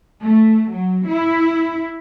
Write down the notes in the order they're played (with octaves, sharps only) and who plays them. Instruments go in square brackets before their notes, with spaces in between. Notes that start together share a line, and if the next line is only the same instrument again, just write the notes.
[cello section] A3
F#3
E4